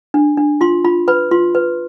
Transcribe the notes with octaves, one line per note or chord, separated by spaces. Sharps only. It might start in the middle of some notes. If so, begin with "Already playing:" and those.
D4
D4
F4 C6
F4 B5
B4 B5
F4 C6
B4